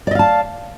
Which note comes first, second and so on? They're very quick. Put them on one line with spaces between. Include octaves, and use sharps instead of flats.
D5 D#5 F5 A5